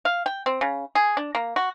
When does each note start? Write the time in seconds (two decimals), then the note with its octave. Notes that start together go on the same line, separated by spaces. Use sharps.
0.05 F5
0.26 G5
0.46 C4
0.61 C#3
0.95 G#4
1.17 D4
1.35 A#3
1.56 F#4